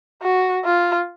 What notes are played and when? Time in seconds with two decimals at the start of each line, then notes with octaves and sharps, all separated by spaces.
0.22 F#4
0.65 F4